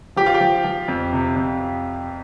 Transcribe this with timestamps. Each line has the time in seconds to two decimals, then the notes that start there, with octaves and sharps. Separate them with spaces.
0.16 F3 G4
0.26 F4
0.34 G4
0.40 F3
0.64 F3
0.88 F2
1.13 C3
1.36 F2